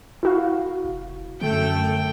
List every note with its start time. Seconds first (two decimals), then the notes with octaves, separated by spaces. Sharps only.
0.23 E4 F#4 F5
0.84 F1
1.41 F#2 D3 A3 G5